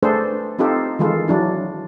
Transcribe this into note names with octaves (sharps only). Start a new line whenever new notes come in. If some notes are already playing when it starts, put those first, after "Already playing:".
A3 D4 G#4 A4 B4 C5
C4 D#4 F4 G4 A4
D#3 E3 G#3 F4 A4
F#3 D4 E4